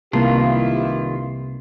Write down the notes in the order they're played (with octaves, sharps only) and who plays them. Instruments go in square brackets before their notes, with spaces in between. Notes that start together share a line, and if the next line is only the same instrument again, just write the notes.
[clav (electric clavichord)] C2 [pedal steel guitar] D#3 F4 [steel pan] A#3 A5 [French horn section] E4 G4 B4